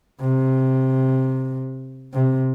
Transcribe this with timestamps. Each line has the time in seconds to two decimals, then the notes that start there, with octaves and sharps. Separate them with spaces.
0.21 C3
2.14 C3